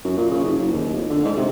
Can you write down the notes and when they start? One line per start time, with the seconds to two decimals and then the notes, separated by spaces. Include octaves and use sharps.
0.05 F#2
0.17 A#2
0.31 C#3
0.44 F#1
0.57 F#1
0.73 D#2
0.93 F1
1.09 D3
1.25 G#2
1.37 C3